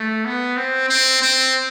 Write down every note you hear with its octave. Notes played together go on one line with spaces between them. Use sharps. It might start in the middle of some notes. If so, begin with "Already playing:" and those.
Already playing: A3
B3
C4
C4
C4